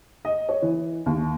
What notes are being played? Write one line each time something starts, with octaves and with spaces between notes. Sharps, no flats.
D#5
C#5
E3
D#2